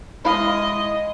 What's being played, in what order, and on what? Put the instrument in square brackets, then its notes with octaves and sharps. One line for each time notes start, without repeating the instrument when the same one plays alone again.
[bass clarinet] G#3 [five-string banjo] E4 F5 [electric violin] D#5